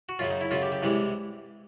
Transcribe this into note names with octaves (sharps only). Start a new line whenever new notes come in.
F#4
F#2 C#3 F#3 F4
D#4
E4
F#2 C#3 F#3 F4
G4
G4
C2 C3 E3 G#3